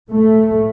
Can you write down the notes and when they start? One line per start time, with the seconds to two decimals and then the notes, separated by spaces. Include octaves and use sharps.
0.10 A2 A3